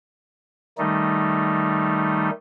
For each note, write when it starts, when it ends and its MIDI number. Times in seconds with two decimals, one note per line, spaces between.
0.78 2.30 51
0.78 2.30 55
0.78 2.30 57
0.78 2.30 63